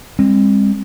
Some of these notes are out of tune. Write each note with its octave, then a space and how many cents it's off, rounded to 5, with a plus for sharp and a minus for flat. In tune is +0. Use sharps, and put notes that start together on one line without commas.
G#3 -40 C4 +25